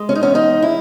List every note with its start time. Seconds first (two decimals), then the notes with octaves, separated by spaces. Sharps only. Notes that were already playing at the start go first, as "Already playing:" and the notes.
Already playing: G#3
0.09 C#4
0.15 D#4
0.22 E2 C#4
0.35 D#4
0.62 E4